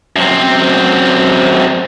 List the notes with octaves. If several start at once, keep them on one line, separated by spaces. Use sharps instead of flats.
F#2 C4